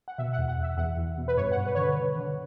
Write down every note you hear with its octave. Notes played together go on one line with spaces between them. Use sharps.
F#5
B2 E5
F#5
E2
F#5
E2
E5
E2 F#5
E2
B2
B4
G2 C#5
F#5
G2
B4
D3 C#5
B4
D3
D3